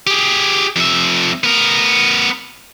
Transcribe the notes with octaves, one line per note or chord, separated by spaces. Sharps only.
G4 G#4
F2 E5
B3 A#4